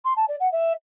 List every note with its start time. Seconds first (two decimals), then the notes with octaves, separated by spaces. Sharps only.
0.05 C6
0.16 A5
0.28 D5
0.40 F#5
0.52 E5